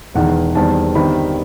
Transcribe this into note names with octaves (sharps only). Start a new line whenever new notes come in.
E1 E2 D#3 F#5
E2 D#3 G3 C4 A5
G1 G2 D#3 G3 C4 B5